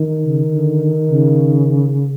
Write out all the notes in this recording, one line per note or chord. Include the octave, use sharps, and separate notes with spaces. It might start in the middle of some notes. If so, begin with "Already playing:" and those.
Already playing: D#3
C#3
D3
C#3